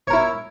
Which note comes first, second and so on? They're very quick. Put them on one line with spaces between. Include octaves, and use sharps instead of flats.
C#5 A#4 E4